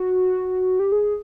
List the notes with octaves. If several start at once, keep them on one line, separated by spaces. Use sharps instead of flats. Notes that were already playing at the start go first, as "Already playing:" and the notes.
Already playing: F#4
G4
G#4